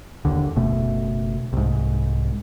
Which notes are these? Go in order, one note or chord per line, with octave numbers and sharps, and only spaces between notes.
E1 A1 D#2 D3
F#1 B2 A3
C2 G#2